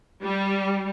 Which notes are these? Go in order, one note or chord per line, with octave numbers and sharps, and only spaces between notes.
G3